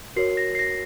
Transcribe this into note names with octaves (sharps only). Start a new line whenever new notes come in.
F#4 A#4 C#5 C7
A#6
C7
A#6